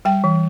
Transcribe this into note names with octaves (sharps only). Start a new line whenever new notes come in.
G3 G5
E3